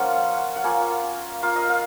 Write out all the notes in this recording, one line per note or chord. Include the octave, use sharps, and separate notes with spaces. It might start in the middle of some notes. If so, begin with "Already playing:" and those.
Already playing: F3 A#3 C#4 F4 F#5
F#5
A#3 F4 G#5
A#3 F4 F5
D#5
F5